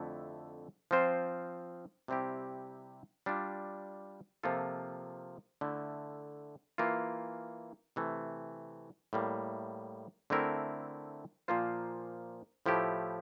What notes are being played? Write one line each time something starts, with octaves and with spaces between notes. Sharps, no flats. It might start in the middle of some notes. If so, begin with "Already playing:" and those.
Already playing: F2 D3 A3 E4
F3 C4 F4 C5
C3 G3 C4 E4 G4
G3 D4 F4
C3 F3 A#3 F4 A4
D3 A3 E4
E3 A#3 F4
C3 E3 A3
A2 G3 A#3
D3 A3 C4 E4 A#4
A#2 F3 A#3 F4 C5
A2 F3 A3 E4 G4